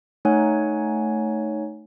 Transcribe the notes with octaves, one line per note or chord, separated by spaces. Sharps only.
A3 D#4 C#5 F#5 G#5